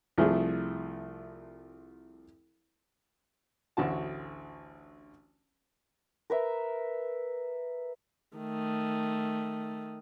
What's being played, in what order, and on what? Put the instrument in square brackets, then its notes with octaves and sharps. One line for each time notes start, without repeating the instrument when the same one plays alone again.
[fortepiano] C2 F3 A3 G#4
A1 D2 D3 F#4 A5
[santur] A#4 B4 E5
[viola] D#3 A3